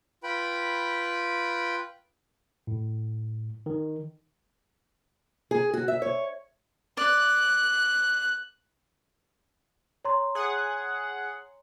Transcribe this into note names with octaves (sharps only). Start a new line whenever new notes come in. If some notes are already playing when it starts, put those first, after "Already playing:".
F4 B4 G5 B5
A2
D#3
G#4
F#4
E5
C#5
D5 F#6
C#5 A#5 C6
G#4 F#5